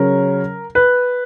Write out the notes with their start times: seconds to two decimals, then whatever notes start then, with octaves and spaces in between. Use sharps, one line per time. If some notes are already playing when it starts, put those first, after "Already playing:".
Already playing: C#3 F#3 C#4 A#4
0.75 B4